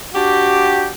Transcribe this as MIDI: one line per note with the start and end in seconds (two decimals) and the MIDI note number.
0.15 0.90 62
0.15 0.90 66
0.15 0.90 67